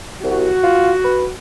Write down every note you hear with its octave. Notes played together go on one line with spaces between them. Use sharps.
C2 F#4
F4
B4